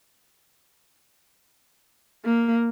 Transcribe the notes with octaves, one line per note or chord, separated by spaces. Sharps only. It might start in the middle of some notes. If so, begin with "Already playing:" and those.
A#3